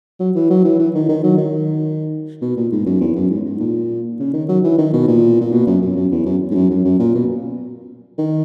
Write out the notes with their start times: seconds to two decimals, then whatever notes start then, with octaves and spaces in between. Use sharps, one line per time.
0.20 F#3
0.35 E3
0.50 F#3
0.65 E3
0.79 E3
0.94 D#3
1.09 D#3
1.23 F#3
1.38 D#3
2.42 B2
2.57 A#2
2.72 G#2
2.86 F#2
3.01 E2
3.15 F#2
3.30 G#2
3.46 G#2
3.59 A#2
4.19 C#3
4.33 D#3
4.48 F#3
4.64 E3
4.78 D#3
4.93 B2
5.07 A#2
5.41 A#2
5.52 B2
5.67 F#2
5.82 F#2
5.96 F#2
6.11 E2
6.26 F#2
6.51 G#2
6.55 F#2
6.70 F#2
6.85 F#2
6.99 A#2
7.14 B2
8.18 D#3